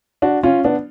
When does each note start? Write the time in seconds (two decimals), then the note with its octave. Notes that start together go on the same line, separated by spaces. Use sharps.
0.22 D4 F#4
0.43 C#4 F4
0.64 B3 D4